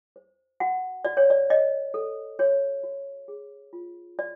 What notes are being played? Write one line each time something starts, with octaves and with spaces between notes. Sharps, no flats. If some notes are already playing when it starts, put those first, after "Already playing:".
C5
F#4 F#5
F#4 D5
C#5
D5
C#5 D#5
A4
F#4 C#5
F#4
G#4
F4
F#4 D5